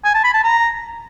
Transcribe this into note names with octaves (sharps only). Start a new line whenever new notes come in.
G#5
A5
B5
A5
A#5